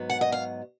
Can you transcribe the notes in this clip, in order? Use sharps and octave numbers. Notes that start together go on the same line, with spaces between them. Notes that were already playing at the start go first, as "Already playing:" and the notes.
Already playing: G#2 F#3 B3
F#5
D#5
F5